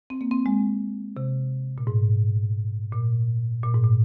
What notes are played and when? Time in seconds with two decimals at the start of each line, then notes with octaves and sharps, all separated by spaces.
0.10 C4
0.21 A#3
0.31 C4
0.46 G#3
1.17 C3
1.78 A#2
1.87 G#2
2.93 A#2
3.63 A#2
3.74 G#2
3.84 A#2